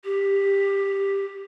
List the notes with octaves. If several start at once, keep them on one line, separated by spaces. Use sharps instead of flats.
G4